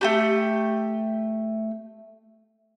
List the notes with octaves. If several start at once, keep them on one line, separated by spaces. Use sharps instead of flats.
A3 F#4 G4